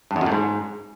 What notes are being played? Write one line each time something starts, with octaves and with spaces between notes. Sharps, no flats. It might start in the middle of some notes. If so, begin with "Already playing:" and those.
G2
E2
F#2
A2
G#2